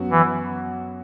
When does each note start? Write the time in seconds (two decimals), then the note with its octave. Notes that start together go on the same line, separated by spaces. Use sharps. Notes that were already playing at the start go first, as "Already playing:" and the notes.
Already playing: F#2 F#3 B3 F#4
0.11 E3